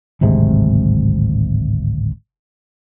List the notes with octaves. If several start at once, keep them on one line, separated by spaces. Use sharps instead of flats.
D1 G#1 C3 G#3